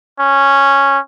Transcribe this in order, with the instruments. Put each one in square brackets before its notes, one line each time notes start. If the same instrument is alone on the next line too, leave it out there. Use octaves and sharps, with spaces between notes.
[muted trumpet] C#4